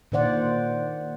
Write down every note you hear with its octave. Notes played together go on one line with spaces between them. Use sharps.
A#2 D#3 C5 D5 F#5